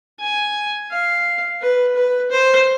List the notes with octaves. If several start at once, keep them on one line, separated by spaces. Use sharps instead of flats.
G#5
F5
B4
B4
C5